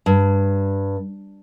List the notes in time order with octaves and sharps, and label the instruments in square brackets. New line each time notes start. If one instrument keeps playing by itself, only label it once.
[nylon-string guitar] G2